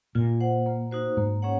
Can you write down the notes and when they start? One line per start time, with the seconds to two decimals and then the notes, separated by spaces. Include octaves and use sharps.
0.15 A#2 F4
0.40 C5 F#5
0.66 A#3
0.91 D#4 F#4 C5
1.17 G#2 A#3
1.42 C#4 G#4 C#5 F#5